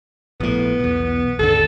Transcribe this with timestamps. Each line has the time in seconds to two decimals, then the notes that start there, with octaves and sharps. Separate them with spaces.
0.40 A#1 A2 B3
0.80 B1 E2
1.39 G#1 D#2 D3 A4